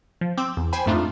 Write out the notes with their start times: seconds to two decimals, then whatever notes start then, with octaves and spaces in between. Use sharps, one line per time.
0.21 F3
0.38 C4 D6 E6
0.57 E2
0.73 C5 G5 G#5 B5
0.86 F2 G#2 A3 D4 D#4 F4